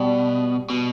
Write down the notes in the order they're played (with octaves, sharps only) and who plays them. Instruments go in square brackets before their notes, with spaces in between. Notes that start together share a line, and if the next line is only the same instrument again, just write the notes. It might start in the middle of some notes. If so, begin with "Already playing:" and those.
Already playing: [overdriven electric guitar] B2 [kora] G3
[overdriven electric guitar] B2